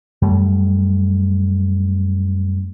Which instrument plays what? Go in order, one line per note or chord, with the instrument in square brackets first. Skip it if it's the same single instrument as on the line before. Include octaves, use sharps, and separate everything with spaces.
[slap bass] F#2 G3 A3